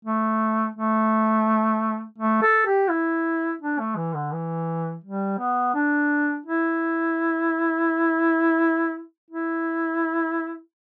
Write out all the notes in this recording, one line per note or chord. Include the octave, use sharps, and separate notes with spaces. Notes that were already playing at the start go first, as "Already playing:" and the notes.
A3
A3
A3
A4
G4
E4
D4
A3
E3
D3
E3
G3
B3
D4
E4
E4